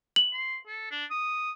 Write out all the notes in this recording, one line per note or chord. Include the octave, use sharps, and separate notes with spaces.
F#7
C6
A4
D4
D#6